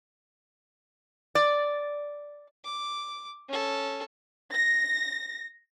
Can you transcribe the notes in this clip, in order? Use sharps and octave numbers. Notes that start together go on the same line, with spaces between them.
D5
D6
C#4 A4
A#6